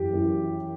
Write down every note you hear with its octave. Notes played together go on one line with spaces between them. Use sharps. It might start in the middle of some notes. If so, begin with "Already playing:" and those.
Already playing: F#2 E3 G4
F#2 E3